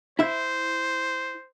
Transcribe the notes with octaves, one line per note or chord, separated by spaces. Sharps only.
E4 C5 E5